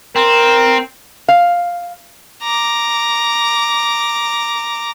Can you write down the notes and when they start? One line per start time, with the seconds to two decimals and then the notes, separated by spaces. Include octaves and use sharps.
0.16 C4 A#4
1.28 F5
2.43 A#5 D6